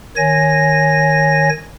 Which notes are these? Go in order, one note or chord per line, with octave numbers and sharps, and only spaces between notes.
D#3 C#5 G#5 A#6